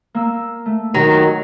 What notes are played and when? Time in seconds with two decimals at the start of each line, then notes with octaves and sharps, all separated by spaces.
0.14 A#3 E6
0.66 A3
0.94 D#3 F#3